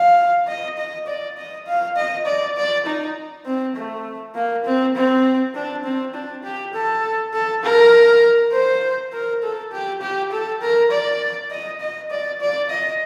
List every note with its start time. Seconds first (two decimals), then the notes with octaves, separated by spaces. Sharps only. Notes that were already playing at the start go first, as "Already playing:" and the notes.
Already playing: F5
0.47 D#5
0.78 D#5
1.07 D5
1.37 D#5
1.67 F5
1.96 D#5
2.26 D5
2.57 D5
2.86 D#4
3.45 C4
3.76 A3
4.35 A#3
4.65 C4
4.95 C4
5.55 D4
5.84 C4
6.14 D4
6.44 G4
6.73 A4
7.33 A4
7.63 A#4
8.52 C5
9.12 A#4
9.43 A4
9.72 G4
10.01 G4
10.32 A4
10.61 A#4
10.91 D5
11.51 D#5
11.81 D#5
12.11 D5
12.41 D5
12.70 D#5